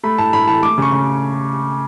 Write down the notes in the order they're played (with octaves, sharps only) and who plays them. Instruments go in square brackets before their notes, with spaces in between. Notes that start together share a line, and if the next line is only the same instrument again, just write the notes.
[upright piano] A3 B5
A2 A5
A2 B5
E3 A5
A3 D6
C#3 C#6
C#3